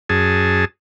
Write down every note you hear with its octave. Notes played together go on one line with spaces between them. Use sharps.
F#2 G#4 A5